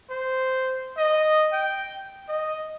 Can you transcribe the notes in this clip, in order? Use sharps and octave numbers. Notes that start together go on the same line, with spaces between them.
C5
D#5
G5
D#5